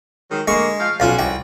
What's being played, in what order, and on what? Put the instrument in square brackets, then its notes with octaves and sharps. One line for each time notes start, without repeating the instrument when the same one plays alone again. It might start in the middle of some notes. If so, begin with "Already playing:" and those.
[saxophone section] D#3 F#3 G#3
[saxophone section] D3 A#3 [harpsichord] G#3 C#6
[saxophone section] F3 F5
[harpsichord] B1 F4 [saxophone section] C#4 D4 F#4
[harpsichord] C2 G5